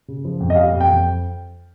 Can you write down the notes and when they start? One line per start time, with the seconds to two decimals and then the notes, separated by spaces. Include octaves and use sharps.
0.08 C#3
0.25 F3
0.40 F2
0.50 D#5
0.56 G3 F5
0.72 F2
0.81 G5
0.88 F2